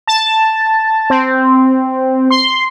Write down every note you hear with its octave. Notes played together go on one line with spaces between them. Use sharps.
A5
C4
C6